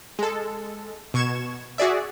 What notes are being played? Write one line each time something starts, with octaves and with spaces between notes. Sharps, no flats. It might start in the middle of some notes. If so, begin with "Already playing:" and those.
G#3 A4
B2 C#6 G#6 E7
F#4 G#4 D5 E5